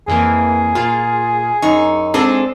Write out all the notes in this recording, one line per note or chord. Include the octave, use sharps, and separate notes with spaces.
F2 E3 A#3 G#4
A#2 F4
F#2 D#4 C#6
G#2 C4 D4 G#4 A4